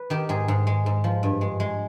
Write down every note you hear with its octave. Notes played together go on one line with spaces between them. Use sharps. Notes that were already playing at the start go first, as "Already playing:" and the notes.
Already playing: B4
D#3 G4
G#2 G#4
G#2
G#3
G#2
F3
G2
G#3
G#3